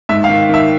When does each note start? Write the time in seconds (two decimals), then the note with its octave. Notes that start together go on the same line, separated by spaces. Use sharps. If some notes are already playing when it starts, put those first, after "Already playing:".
0.09 G#2 E5
0.24 F5
0.29 D#3
0.49 D#3 E5